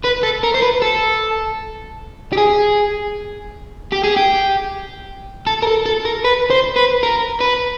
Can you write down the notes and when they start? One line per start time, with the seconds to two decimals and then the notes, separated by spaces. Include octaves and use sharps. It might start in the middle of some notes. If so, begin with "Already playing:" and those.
0.04 B4
0.23 A4
0.44 A#4
0.55 C5
0.62 B4
0.82 A4
2.32 G4
2.37 G#4
3.92 G4
4.04 G#4
4.17 G4
5.47 A4
5.63 A#4
5.67 A4
5.86 A4
6.05 A#4
6.25 B4
6.50 C5
6.76 B4
7.03 A#4
7.41 B4